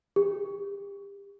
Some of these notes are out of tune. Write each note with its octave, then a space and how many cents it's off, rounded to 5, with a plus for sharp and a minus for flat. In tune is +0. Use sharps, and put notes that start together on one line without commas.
G4 +35